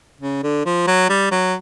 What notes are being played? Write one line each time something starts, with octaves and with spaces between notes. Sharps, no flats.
C#3
D3
F3
F#3
G3
F#3